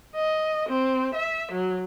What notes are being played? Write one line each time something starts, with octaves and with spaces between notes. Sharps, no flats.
D#5
C4
E5
F#3